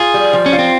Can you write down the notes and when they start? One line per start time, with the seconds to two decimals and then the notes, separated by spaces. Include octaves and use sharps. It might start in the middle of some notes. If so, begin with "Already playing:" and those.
Already playing: F4 G#4
0.14 G3
0.33 F3
0.46 C#4
0.53 F4
0.59 C4